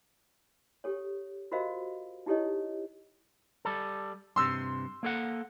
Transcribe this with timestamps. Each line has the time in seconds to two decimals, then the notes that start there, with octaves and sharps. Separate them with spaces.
0.84 G4 A4 C#5
1.52 F4 F#4 A#4 C5 D#5 F5
2.26 D#4 E4 G4 A4 C#5 D#5
3.65 G3 A4
4.36 G2 C3 C6 E6
5.03 A#3 A4 F#5